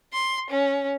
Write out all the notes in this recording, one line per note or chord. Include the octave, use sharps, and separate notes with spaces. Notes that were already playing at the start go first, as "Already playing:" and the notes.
C6
C#4